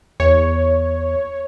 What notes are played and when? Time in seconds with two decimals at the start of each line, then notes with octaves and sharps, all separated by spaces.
0.20 E2 C#5